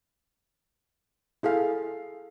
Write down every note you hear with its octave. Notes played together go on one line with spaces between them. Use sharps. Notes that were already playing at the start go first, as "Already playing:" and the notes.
E4 G#4 A4 F5